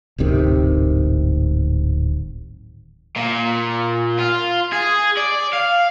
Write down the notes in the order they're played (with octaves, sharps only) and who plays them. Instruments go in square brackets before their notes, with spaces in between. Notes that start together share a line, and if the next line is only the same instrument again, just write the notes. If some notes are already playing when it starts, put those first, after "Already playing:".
[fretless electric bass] D1 G#1 C3 D#3
[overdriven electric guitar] A#2
F4
G#4
D5
F5